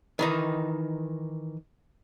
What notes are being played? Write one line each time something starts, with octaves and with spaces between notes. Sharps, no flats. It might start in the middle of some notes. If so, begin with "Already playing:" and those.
D#3 E3 D#4